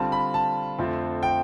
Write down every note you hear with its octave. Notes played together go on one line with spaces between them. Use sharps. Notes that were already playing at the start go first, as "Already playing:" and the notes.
Already playing: D3 G3 C4 F4 A5
B5
A5
F2 D3 F3 A3 C4
G5